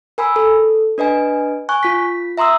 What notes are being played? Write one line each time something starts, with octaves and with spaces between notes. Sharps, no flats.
A#4 G#5 B5 E6
A4
D4 B4 D#5 G#5
G#5 C#6 F#6
F4 B6
E5 A#5 C6 D#6 E6